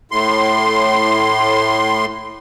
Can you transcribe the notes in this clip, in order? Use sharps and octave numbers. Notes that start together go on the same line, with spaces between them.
A2 C6